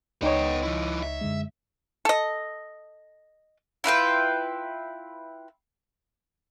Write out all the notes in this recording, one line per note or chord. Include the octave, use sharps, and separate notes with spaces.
C#2 B3 D#4 C#5 G5
F3 E4
E5
F#2 D3 G#3
A4 D#5
E4 F4 B4 G5